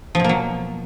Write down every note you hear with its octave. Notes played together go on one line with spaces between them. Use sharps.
B2 F3 F#3 A#3